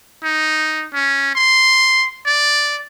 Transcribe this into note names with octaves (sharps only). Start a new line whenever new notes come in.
D#4
C#4
C6
D5